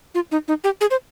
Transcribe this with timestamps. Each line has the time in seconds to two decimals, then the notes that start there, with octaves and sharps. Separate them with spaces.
0.15 F4
0.32 D#4
0.48 D#4
0.64 G4
0.81 G#4
0.91 C5